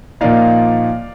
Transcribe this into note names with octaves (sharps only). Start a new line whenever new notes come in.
A#2 F3 A#3 D#4 D5 F5